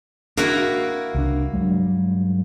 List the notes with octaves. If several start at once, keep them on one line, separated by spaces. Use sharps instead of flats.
A#3 D4 E4 F#4
C2 D4
G2 F#3 G#3